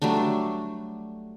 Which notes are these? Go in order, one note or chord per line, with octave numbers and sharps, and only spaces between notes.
F#3 G3 A3 D4